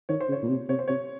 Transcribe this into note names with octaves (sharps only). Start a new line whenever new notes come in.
D#3 C#5
C5
C#3
C#5
A#2
C3
C3 C#5
C5
C3 C#5